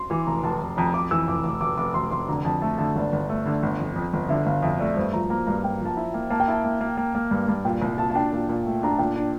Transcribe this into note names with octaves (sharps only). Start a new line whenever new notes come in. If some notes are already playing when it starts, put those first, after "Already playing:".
Already playing: C6
E3 D6
F1 A#5
F1 A5
F1
F2 A#5
F2 D6
E3 E6
F1 D6
F1 D6
F1 D6
F1 D6
F1 C6
F1 C6
D3 A#5
F2 A5
A3 A5
D3 A5
G1 D5
G1
A3
D3
G1
F2
F2
G1
D3 E5
G1 F5
F2 E5
A3 D5
G2 C5
F3 A#5
A#3 A#5
G2 A#5
A#3 G5
F3 A5
E4
A#3
A#3 A5
G5
E4 A5
A#3
A#3
A#3
A#3
G2
G2
A#2 G5
C2
A#2 A5
A5
D4 G5
A#2
A#2
A3
D4 A#5
A5
A#2 G5
D4